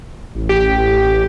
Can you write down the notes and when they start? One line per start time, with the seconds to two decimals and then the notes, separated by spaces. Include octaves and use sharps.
0.35 A1
0.49 G4